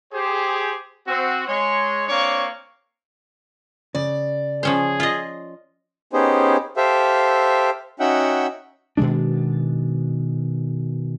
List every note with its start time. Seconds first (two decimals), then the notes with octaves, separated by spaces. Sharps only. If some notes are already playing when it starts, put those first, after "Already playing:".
0.12 G4 G#4 C5
1.07 C4 F#4
1.47 G#3 C#5 C6
2.08 A#3 C4 D4 C#5 C#6 D6
3.95 C#3 D5
4.63 F3 C#4 G#4 C5
5.00 F4 D#5
6.13 B3 C#4 D#4 G4 G#4 C5
6.77 G4 A4 C5 E5 F5
8.00 C#4 D#4 F#4 E5 F#5 G5
8.97 B2 D#3 G#3 D4